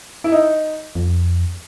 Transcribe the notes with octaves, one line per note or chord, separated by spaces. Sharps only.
E4
D#4
F2